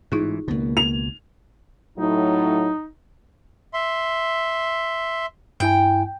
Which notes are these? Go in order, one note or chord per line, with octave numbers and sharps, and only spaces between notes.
A1 G#2 E3 D#4 F4 G#4
C#2 B2 A#3
F7
A2 F#3 D#4
E5 C6
G2 E4 G5 G#5